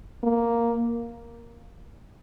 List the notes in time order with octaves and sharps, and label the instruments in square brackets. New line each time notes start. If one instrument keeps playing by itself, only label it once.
[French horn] A#3